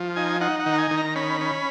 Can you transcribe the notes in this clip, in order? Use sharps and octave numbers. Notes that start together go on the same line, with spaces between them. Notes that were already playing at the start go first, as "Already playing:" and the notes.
Already playing: F3
D#4 G#5
D#4 F#5
F#5
D#3
A#5
G#5
D#3
A#5
C#4 B5
C#4